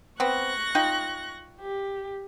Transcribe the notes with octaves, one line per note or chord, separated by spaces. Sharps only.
B3 C4 C#6 F#6 A#6
D#4 F4 G5
G4